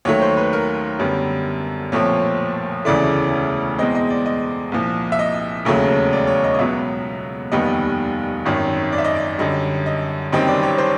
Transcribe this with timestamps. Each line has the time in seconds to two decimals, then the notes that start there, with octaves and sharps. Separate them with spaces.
0.05 D#2 D#3 F#3 A3 C#5
0.22 C5
0.37 B4
0.53 A#4
0.99 F#2 D3 G3 B3
1.92 B1 A#2 F3 A3 C4 C#5
2.85 E1 D2 C#3 E3 A3 D5
3.78 E2 B2 G#3 C4 D#5
3.95 D#5
4.10 D5
4.26 D#5
4.72 C2 A#2 F3
5.12 E5
5.19 D#5
5.65 E1 D#2 C#3 F#3 A3
6.13 D5
6.27 C#5
6.44 D#5
6.54 D#5
6.59 C#2 B2 F#3 B3 E5
7.52 F1 D#2 D#3 G3 B3 D#5
8.45 G#1 F#2 D#3
8.93 D5
8.98 E5
9.04 D#5
9.15 D5
9.38 F#2 D3 G3 D#5
9.86 D#5
10.32 F#1 F#2 D#3 G3 C4 D#5
10.48 D5
10.63 C#5
10.78 C5